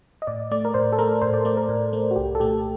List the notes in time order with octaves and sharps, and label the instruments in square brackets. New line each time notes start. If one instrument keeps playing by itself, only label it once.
[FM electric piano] D#5
A2 D5
A3 D5
A#4
A2 C5
A4
A3 A#4
A2 C5
D5
A3 D5
A#4
A2
A3
F#4
C2 G4
A4
A#2 A3 G4